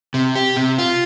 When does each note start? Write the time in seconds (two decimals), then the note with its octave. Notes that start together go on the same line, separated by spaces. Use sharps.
0.14 C3
0.36 G4
0.57 C3
0.78 F4